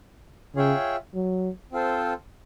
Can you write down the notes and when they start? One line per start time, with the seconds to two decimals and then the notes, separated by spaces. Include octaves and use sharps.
0.56 C#3 F4 G#4 C#5 E5 G5
1.14 F#3
1.72 C4 F4 A4 C5